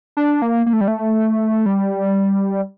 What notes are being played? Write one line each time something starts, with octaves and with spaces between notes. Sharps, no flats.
D4
A#3
A#3
A3
G3
A3
G3